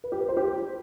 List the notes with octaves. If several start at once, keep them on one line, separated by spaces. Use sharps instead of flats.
B4
G4
B4
C5
G4